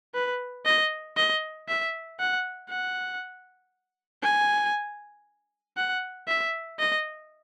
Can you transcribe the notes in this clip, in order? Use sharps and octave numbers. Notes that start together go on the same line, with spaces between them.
B4
D#5
D#5
E5
F#5
F#5
G#5
F#5
E5
D#5